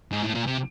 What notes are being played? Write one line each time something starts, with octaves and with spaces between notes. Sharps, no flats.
G#2
A2
A#2
C3